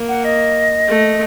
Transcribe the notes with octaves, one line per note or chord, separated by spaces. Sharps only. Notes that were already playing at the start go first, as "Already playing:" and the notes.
Already playing: A#3
F#5
D#5
A3